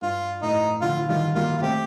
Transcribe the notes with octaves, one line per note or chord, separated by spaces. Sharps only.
G2 F4
A2 D#4
D3 F3 F4
F3
D#3 G3 F4
G3 A#3 F4
F4
A3 C4 G4